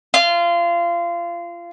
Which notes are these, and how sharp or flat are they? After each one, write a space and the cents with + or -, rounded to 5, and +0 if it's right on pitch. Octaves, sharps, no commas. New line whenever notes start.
F4 -25